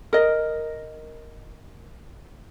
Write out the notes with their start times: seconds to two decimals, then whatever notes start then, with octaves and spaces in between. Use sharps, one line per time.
0.13 A#4 D#5